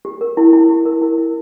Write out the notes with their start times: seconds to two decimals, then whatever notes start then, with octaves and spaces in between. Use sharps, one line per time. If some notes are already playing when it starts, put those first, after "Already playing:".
0.05 G4
0.21 A#4
0.37 E4
0.53 E4
0.69 G4
0.86 A#4
1.02 E4
1.18 E4